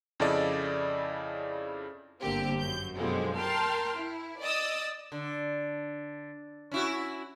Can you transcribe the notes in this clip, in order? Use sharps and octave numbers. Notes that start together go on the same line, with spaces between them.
F2 C#3 E4 A4 D5 D#5
G1 D3 A#3 C4 G4
F#2 G6
F#2 B2 D3 F3 G3 G#3
A#4 G5 A5 C6 F6
E4
D5 D#5 D#6 E6 A6
D3
C#4 E4 F#4